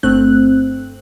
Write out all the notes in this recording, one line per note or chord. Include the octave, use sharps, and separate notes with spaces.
G1 A3 C4 F#6